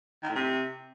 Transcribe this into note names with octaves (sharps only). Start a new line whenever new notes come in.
D#3
A2
C3